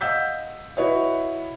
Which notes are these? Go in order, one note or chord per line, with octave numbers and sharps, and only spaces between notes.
D#5 F5 F#5 E6 G6 B6
E4 F#4 B4 C#5 D#5 E5